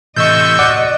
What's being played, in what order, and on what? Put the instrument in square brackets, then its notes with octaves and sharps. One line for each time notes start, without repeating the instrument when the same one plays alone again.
[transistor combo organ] A2 C3 E3 [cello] D#5 [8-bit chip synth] C#6 E6 G6
[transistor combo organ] F#4 [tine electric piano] D5 F#5 D6